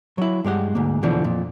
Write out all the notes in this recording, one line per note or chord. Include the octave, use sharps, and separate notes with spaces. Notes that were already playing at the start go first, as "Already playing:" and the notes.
F#3 E4
G2 G#3 G4 F#5
D2 G#2 A#3
E2 B2 D3 E3 F3
F2 A#2